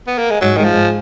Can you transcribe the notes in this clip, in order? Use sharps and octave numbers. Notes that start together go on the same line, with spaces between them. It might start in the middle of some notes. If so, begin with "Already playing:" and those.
B3
A#3
G#3
G#2 F#3
D#3 G#3
F3
G#2